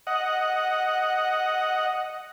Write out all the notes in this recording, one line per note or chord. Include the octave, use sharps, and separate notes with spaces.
D#5 F#5